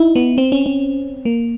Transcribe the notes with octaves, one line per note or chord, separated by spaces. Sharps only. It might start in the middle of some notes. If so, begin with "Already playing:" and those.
Already playing: D#4 E4
B3
C4
C#4
C#4
A#3